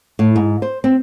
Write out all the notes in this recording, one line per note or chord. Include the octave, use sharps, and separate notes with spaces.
A2
G#2
C5
C4